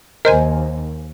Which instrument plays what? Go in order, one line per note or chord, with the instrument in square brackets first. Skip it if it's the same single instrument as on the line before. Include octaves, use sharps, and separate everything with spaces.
[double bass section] D#2 [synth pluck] A#4 C5 G#5 [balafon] D#5